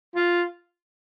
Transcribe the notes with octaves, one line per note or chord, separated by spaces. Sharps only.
F4